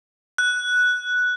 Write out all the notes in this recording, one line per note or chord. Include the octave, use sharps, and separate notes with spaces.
F#6